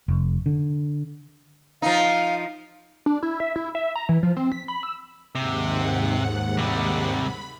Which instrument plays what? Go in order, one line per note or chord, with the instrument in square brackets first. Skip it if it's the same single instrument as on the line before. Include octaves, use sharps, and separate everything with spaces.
[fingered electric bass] F1
D3
[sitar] F3 D#4 [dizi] F5
[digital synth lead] D4
E4
E5
E4
E5
A#5
E3
F3
C4
B6
B5
E6
[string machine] D#2 G#2 F#5 [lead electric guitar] C3
[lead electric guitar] C3 G3
[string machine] B5